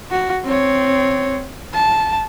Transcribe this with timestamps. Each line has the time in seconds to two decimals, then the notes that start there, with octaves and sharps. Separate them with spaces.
0.11 F#4
0.45 C4 C#5
1.73 A5